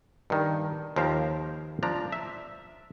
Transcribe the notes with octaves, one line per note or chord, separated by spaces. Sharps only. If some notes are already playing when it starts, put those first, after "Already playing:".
G2 D#3
D#2 F3 A#4 C5 F5
F3 D4 A#5
E5